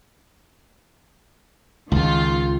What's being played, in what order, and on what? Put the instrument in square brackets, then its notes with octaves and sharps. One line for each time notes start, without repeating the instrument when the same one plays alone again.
[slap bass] C#2 [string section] D#3 F4